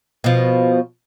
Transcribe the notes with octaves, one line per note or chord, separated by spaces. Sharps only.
B2 F3